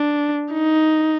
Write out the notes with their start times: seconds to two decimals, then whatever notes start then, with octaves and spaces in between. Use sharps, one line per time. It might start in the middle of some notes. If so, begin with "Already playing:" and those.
Already playing: D4
0.53 D#4